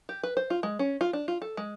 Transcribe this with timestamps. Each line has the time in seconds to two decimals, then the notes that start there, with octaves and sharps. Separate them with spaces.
0.09 G4
0.23 B4
0.37 C5
0.50 F4
0.63 G#3
0.79 C#4
1.01 F4
1.13 D4
1.28 F4
1.42 A4
1.57 G#3